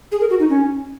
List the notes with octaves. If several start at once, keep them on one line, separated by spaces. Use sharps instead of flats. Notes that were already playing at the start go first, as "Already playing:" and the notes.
G#4
A#4
F#4
D#4
C#4